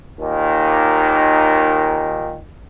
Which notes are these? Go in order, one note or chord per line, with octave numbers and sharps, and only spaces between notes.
D#2 A#2 D#3